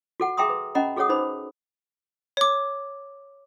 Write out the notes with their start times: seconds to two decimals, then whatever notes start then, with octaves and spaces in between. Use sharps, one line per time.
0.20 F#4 A4 F#5
0.37 G#4 E5 G5 A#5 C6 D#6
0.50 B4
0.75 C#4 D#5 F#5 A#5 B5
0.96 F#4 G#4 A4 C#5 F#5 D#6
1.09 D#4 B4 C5 B5
2.37 C#5 D6